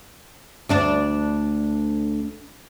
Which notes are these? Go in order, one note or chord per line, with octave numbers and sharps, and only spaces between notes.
D2 D4 D5